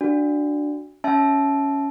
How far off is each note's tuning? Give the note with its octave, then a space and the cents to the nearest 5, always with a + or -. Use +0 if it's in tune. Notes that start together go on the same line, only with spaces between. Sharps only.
D4 +0 F#4 +0
C#4 +10 E5 +0 A5 -20